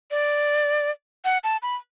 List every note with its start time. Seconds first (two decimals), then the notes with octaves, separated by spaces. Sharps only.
0.11 D5
1.25 F#5
1.44 A5
1.62 B5